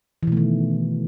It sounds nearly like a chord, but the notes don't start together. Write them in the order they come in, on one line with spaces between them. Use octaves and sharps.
E3 B2 A3 D#3